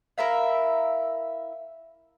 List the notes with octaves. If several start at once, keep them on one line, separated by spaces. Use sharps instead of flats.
E4 A#4 E5 F5